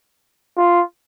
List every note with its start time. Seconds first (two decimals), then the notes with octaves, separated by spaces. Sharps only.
0.57 F4